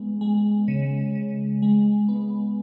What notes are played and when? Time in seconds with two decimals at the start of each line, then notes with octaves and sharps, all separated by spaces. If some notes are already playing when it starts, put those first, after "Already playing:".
Already playing: G#3 B3
0.21 G#3
0.68 C#3
1.15 C#3
1.62 G#3
2.08 B3